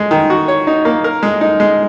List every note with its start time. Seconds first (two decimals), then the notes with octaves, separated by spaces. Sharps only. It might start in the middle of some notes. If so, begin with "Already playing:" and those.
Already playing: G#3
0.11 D#3
0.30 F#4
0.48 C#5
0.67 D#4
0.85 A#3
1.04 A#4
1.23 G#3
1.41 D#4
1.60 G#3